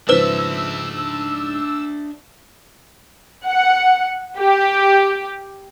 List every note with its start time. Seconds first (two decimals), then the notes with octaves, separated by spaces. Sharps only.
0.09 G#2 C#3 F3 D4 B4 C5 E5 E6
3.46 F#5
4.38 G4